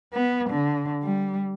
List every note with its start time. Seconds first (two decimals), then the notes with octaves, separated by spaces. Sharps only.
0.13 B3
0.49 D3
1.03 G3